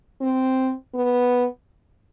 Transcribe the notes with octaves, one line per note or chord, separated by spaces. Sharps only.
C4
B3